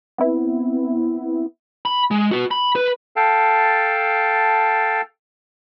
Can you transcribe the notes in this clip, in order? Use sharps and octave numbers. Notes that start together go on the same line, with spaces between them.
B3 C4 E4
B5
G#3
B3 F#4
B5
B4
A4 F5 G5 A5